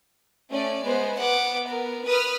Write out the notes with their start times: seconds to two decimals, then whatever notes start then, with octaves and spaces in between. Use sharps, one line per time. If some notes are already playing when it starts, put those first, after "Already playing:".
0.51 A3 C#4 D5
0.85 G#3 B3 C5
1.19 B3 F#5 D6
1.67 A#4
2.05 B4 D#6 F6